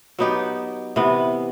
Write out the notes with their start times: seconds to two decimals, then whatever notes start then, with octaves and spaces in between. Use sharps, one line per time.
0.19 F#3 B3 D#4 G4
0.96 C3 E3 B3